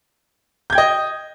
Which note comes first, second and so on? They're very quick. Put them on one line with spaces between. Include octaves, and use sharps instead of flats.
G6 G#6 G5 D#5